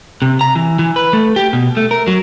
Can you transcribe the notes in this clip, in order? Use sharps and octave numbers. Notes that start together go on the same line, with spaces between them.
C3
A#5
E3
E3
B4
A3
G4
B2
A3
A#4
F#3